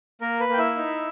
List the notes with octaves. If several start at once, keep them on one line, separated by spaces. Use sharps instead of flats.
A#3 A#4
B4
A#3 G5
E4 E5
D#4